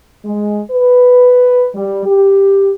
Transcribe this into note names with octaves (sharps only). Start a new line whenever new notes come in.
G#3
B4
G3
G4